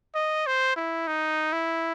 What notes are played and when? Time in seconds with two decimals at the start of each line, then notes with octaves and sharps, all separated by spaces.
0.15 D#5
0.47 C5
0.76 E4
1.07 D#4
1.53 E4